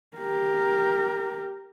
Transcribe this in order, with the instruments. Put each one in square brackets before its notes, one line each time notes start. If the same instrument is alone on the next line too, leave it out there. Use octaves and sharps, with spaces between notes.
[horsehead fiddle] G4 A#4